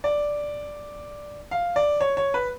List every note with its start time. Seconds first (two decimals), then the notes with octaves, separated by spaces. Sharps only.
0.04 D5
1.51 F5
1.76 D5
2.01 C#5
2.17 C#5
2.34 B4